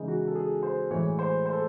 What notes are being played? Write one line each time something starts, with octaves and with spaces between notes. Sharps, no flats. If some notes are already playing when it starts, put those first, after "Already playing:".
Already playing: C#3 E3 G#3 D#4
F#4
A4
G#4
C5
A2 E3 G#3 C#5
C5
C5
A4